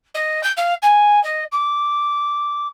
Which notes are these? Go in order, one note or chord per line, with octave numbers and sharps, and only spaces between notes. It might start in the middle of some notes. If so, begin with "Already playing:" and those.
D#5
G6
F5
G#5
D#5
D6